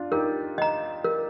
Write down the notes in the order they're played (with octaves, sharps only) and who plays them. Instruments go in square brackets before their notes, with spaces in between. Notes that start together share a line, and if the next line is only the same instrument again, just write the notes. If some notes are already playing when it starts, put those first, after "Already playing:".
Already playing: [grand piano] D4 F4
[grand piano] D#4 G4 [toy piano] A#4
[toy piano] D#5 A#5
A#4